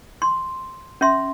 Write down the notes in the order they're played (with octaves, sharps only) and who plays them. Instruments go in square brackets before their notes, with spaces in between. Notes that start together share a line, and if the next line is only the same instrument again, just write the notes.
[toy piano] C6
C#4 E5 C6